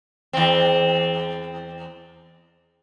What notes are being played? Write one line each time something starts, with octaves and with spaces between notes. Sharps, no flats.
E2 C4